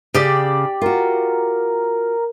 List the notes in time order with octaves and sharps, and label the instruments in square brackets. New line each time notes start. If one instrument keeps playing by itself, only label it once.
[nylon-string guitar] C#3 [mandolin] G4 D5
[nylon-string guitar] F4 F#4 [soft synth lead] A#4